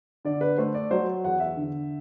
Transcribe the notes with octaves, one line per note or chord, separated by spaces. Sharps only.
D3 D5
B4
A3 C5
D5
F#3 C5
E2 F#5
E5
D3